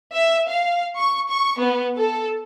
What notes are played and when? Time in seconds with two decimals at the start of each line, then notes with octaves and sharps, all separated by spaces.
0.13 E5
0.48 F5
0.97 C#6
1.29 C#6
1.58 B3
1.97 A4